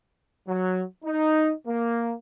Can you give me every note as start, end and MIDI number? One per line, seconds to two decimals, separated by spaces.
0.46 0.82 54
1.04 1.52 63
1.66 2.12 58